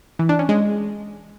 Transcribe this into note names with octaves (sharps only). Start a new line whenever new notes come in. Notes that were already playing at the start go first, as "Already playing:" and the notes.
E3
D4
C#4
G#3